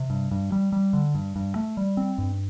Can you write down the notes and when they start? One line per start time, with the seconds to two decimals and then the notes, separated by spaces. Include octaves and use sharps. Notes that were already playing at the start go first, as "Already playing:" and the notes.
Already playing: C3
0.10 G2
0.31 G2
0.52 G3
0.72 G3
0.93 D3
1.15 G2
1.36 G2
1.56 A3
1.77 G3
1.97 C4
2.18 G2